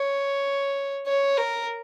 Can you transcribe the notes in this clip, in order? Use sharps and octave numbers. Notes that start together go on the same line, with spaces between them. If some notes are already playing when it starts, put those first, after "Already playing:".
Already playing: C#5
C#5
A#4